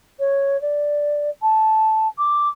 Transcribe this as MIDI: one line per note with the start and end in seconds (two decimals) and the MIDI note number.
0.19 0.59 73
0.61 1.29 74
1.42 2.07 81
2.18 2.49 86